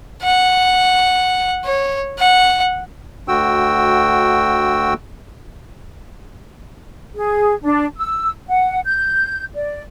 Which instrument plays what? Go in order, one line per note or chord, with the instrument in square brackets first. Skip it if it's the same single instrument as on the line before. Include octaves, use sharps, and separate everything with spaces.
[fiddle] F#5
C#5
F#5
[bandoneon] D2 D3 F#4 G5 E6
[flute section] G#4
D4
E6
F#5
G6
D5